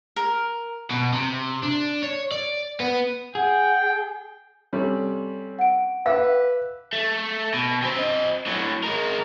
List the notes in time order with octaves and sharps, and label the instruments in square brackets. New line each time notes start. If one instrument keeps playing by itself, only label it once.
[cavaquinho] A#4
[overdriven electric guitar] B2
C3
D4
C#5
D5
B3
[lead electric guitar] G#4 [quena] F#5 [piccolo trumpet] G5
[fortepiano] C3 G3 C#4 [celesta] A4 C#5
[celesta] F#5 D7
[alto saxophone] B4 [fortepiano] E5 D6 E6 [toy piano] F5
[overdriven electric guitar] A3
B2
C3 C4
C4 D#5
A2 F#3
G#3 A#4